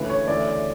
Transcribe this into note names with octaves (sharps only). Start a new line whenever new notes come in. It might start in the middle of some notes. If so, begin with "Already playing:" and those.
Already playing: D2 C#3 E3 B4
C#5
D2 C#3 E3 D5